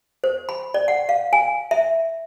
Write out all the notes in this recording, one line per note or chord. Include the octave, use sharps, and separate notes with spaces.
C5
B5
D5
F#5
F5
G#5
E5